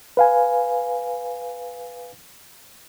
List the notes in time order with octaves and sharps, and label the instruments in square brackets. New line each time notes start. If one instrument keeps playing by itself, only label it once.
[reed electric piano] B4 F5 G#5